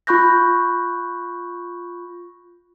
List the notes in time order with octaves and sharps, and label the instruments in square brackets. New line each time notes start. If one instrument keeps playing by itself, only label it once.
[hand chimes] F4 B5 C#6 F#6 G6 A#6